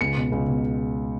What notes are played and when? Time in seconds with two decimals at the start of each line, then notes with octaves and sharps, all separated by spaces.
0.01 C#2 C#7
0.17 B2
0.32 C#2
0.49 B2